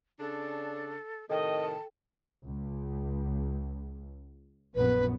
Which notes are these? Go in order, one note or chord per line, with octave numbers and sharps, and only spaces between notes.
C#3 D4 A4
A2 C3 D#3 A4 D#5 G5 A5
C#2
A#1 F#2 B3 B4